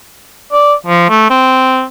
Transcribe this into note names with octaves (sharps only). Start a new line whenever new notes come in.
D5
F3
A3
C4